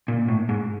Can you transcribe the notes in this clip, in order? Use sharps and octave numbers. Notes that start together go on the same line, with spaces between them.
A#2
A2
G#2